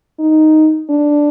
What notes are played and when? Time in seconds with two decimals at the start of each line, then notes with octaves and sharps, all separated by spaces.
0.19 D#4
0.90 D4